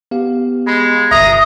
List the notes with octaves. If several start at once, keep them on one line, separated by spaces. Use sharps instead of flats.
B3 G4 F5
G#3 B5
G1 C2 E5 A#5 D#6